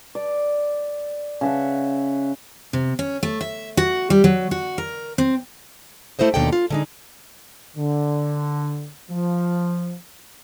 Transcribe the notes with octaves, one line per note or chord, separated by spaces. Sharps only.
D5
C#3 E5 F#5
C3
C#4
A3
E5
F#4
G3
F#3
F#4
A#4
C4
A3 E4 G4 C5 D#5
D#2 B2 D3 A4 D5 G5
F4
D3 G#3 D#4
D3
F3